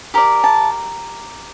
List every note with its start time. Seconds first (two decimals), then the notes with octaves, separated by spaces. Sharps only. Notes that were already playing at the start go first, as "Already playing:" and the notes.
0.14 G4 A#4 D5
0.44 A5